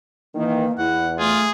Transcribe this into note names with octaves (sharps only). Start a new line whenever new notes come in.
D#3 E3 A#3
E2 E4 F#5
A3 F4 G#4